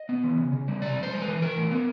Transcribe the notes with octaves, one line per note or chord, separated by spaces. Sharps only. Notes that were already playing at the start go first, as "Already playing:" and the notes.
Already playing: D#5
B3
E3
C#3
C#3
G3
C3 D5
F2
C5
G#3
E3 B4
E3 A#4
A2
B3